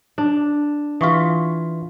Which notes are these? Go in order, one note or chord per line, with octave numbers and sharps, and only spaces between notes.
D4
E3 F4 F5 C#6 D#6